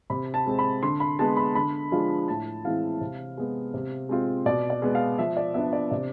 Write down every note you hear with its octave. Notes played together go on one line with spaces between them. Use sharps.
C3 B5
A5
G#3 C4
B5
D3 C6
B5
G#3 B3 A5
B5
D3 B5
F3 G#3 D4 F4
A2 A5
E3 G#3 C4 E4 F5
C3
G#3 B3
C3
G#3 C4 F4
B2 D5
D5
G#3 B3
F5
F3 E5
D5
B3 D4 E5
D5
C3 D5